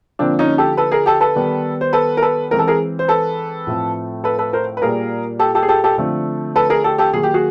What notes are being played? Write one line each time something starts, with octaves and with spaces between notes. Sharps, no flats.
D3 F3 A#3 C4 D4
C#4 D#4
G4 A4
A4 B4
G#4 A#4
G4 A4
A4 B4
D#3 G3 B3
C5
A4 B4
A#4
A4 B4
E3 G#3 C4 A#4
A4
G#4 A#4
C5
A4 B4
A2 F3 A3 C4
A4 B4
A4 B4
A#4 C5
B4
A#2 G3 A#3 G#4 A#4
G4 A4
G4 A4
G#4
G4 A4
G4 A4
D3 F3 A3 C4
A4 B4
G#4 A#4
G4 A4
G4 A4
D#3 F#3 A#3 G#4
G4
F#4 G#4